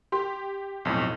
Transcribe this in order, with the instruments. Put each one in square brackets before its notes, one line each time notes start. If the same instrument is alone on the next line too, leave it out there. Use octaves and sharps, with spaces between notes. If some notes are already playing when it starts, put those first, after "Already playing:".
[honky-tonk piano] G4 [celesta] C6
[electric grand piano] B1 F2 A2